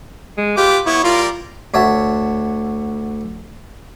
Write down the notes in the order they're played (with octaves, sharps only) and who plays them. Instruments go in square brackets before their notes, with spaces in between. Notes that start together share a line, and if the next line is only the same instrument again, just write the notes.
[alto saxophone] G#3
[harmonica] F4 B4 D6 [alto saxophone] G4
[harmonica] B3 C#5 [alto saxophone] E4
[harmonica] G3 A#4 D5 [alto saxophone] F4
[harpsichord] D2 C#5 E5 F#5 A5